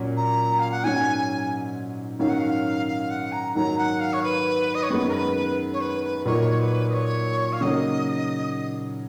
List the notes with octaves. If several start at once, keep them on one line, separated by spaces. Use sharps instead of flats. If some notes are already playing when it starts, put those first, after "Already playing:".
Already playing: A#2 F#3 C#4
A#5
F5
F#5
G#2 F#3 C#4 G#5
G#5
G#2 D#3 F#3 C#4 F5
F#5
F5
F5
F#5
A#5
G#2 D#3 F#3 A#5
F#5
F5
C#5
B4
D#5
C#5
F#2 D#3 G#3 B3 B4
A#4
B4
B4
C#5
B4
B4
A#2 F#3 A#3 D#4 C#5
B4
D#5
C#5
F5
C#3 F#3 A#3 D#4 D#5